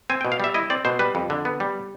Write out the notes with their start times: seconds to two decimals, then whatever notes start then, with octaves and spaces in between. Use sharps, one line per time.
0.10 C4 G#5
0.21 G5
0.25 B2
0.32 F5
0.40 G3 E5
0.54 E4 D#5
0.70 C4 D5
0.85 B2 C5
0.99 G3 B4
1.15 F2
1.30 D3
1.45 B3
1.60 G3